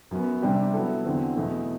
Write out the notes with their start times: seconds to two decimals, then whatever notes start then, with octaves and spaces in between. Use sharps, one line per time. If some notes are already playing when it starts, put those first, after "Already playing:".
0.11 F#2 F#3 B3
0.42 C3 G3 D4 G4
0.73 F#3 B3 E4 A4
1.05 E2 D3 F#3 C4
1.36 E2 B2 A3